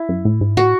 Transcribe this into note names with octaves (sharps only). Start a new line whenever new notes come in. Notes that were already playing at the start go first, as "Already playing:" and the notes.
Already playing: E4
F#2
A2
G#2
A2 F#4